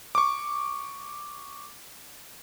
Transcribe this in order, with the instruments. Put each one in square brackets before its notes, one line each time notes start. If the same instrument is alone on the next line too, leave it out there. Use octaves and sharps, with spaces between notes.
[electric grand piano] C#6 D6